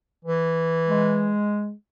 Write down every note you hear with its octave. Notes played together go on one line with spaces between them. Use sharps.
E3
G#3